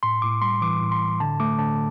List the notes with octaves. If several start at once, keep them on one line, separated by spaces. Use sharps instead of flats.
A2 C6
A2 D6
G3 C6
E3 D6
A2
C6
A2
D3 A5
A3 D6
D3 A5